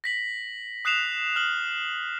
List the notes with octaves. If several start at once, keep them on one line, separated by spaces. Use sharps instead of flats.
A#6 B6 F#7
D#6 F#6 C7 E7 F7
F6 F7 F#7